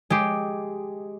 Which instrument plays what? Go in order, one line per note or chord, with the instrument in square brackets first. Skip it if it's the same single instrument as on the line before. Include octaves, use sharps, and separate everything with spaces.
[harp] G#3 G4